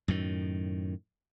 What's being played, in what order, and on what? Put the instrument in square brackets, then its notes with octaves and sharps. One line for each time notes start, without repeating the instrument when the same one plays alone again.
[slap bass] F#2 A2 D#3